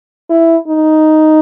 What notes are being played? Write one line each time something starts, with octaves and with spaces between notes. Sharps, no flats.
E4
D#4